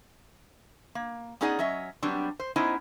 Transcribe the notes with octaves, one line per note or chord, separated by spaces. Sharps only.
A#3
B3 C#4 D#4 G#4 D5 F#5
F#3 C#4 D#5 E5
F#3 G3 B3 C4 D4
C5
B3 C#4 D#4 E4 C5 D#5